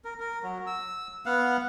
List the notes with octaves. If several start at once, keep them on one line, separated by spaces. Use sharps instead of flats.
A#4
A#4
F#3
E6
B3 F5 F#5